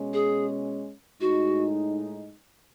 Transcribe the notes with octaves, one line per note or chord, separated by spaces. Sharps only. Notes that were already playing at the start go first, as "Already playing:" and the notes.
Already playing: B2 G#3 C#4
G#4
A2 G#3 D#4 F#4